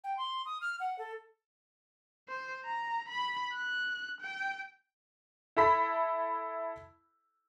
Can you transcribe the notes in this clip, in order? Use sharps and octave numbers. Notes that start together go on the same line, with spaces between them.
G5
C6
D#6
F6
F#5
A4
C5
A#5
B5
F#6
G5
E4 A4 B5 B6